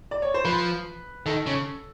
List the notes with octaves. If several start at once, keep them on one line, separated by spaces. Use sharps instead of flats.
D5
C#5
C5
F3 B4
D#3 A4
C#3